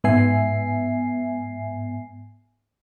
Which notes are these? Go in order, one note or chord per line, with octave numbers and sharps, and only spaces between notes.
G#2 B3 E5 G#5 C7